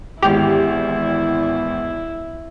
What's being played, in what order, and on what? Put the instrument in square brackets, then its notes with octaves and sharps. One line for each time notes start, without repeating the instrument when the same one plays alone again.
[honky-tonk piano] G#1 G#3 F7 [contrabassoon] E2 [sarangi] E4 [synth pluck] G4